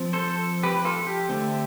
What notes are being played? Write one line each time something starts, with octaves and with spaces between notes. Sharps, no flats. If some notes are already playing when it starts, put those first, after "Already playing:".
Already playing: F3 C4
A4 C5
G4 B4
B4
F4 A4
G4
D3 A3 C4